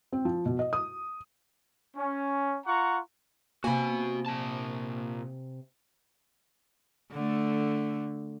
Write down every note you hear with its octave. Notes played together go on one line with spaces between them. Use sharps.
C4
F3
B2
D#5
D#6
C#4
F4 F#5 A#5 C#6
C3 A#3 F#4 G#5 B5
A#2 A5
D3 A3